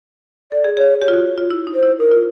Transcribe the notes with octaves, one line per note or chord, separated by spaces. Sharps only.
A4 D5
G#4
G#4 C#5
G4 C#5
F4
F#4
F4
E4
D#4
C5
E4
D#4 A#4
F4